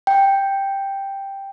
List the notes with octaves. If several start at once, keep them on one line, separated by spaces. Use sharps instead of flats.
G5